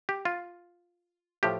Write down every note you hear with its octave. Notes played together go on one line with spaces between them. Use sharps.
G4
F4
A2 F3 G4